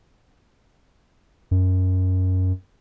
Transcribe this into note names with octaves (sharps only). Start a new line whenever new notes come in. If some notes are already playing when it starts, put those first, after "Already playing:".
F#2